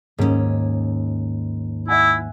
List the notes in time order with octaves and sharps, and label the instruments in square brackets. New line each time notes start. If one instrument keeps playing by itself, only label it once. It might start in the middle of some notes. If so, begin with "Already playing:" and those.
[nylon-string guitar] D#2 C#4 [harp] G#2
[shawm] E4 [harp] E5 F#5 G#5